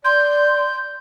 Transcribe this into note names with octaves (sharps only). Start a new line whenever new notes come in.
D5 C6 G6